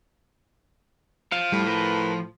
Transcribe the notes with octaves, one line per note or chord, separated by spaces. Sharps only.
F3 F5
A2 G3
A#4 B4